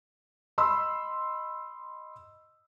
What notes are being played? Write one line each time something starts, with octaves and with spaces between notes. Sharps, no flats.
D#5 B5 C6 E6